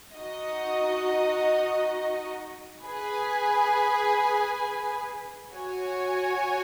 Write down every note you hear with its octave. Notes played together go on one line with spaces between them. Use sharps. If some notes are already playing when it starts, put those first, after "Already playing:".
D#4 F#4 D#5
G#4 B4 G#5
F#4 C#5 G#5